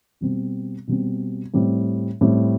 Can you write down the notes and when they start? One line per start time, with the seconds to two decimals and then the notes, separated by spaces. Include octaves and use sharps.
0.21 B2 G3 C4
0.87 B2 G3 C4
1.54 A2 G3 C4
2.21 A2 G3 C4